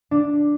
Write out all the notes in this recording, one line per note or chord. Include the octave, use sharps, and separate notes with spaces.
D4